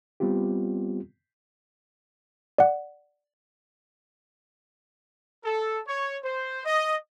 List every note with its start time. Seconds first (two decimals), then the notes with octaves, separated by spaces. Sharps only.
0.20 G3 B3 C4 F4 G4
2.58 D5 F#5
5.45 A4
5.87 C#5
6.24 C5
6.65 D#5